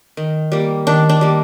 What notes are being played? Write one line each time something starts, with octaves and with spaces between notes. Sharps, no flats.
D#3
G3 A#3
D#3 D4
D4
G3 A#3